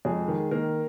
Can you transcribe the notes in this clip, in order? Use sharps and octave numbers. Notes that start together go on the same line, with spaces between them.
F2 G#3 G#4
D#3
D#3 A#3 A#4